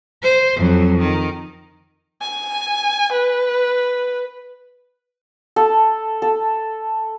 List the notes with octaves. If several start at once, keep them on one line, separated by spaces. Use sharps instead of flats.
C5
F2 F#3
D#3
G#5
B4
A4
A4